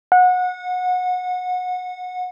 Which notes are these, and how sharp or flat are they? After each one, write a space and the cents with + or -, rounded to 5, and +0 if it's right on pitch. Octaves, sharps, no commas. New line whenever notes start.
F#5 -25